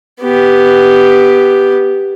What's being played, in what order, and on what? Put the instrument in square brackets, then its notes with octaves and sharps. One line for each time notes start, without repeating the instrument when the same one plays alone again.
[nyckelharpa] B3 G4